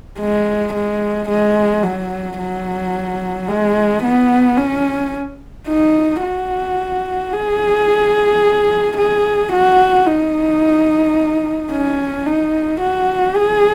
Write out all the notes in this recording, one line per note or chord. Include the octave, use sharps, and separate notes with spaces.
G#3
G#3
G#3
F#3
F#3
G#3
B3
C#4
D#4
F#4
G#4
G#4
F#4
D#4
C#4
D#4
F#4
G#4